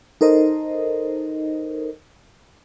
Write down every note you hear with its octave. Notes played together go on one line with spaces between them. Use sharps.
D#4 A4 A#4 C5 D#5